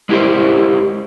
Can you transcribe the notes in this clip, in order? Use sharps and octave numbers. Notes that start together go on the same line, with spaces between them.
G#3 E4 G4 A#4 C5